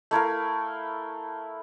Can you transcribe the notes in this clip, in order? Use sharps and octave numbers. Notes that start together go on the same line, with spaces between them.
A3 E4 A#4 F5